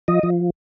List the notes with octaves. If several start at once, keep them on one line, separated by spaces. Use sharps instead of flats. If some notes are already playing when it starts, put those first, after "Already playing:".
F3 D#5
F3